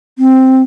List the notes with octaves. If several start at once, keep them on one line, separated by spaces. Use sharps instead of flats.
C4